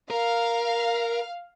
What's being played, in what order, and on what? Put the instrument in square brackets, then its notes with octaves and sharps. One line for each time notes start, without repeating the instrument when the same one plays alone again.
[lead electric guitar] A#4 [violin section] F5